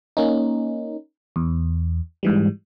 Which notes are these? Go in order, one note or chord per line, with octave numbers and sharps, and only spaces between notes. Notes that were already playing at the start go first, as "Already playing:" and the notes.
A#3 C#4 D#4
E2
G#2 E3 G3